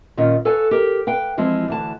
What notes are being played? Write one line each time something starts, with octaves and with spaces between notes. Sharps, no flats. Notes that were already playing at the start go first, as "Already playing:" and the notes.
A#2 D#3 C#4 F4
A4 B4 C#5 F5 G#5
G4 A#4
B4 F5 G5
E3 F3 G#3 C4
D2 E3 A5